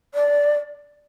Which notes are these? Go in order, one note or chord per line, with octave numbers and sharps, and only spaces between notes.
D5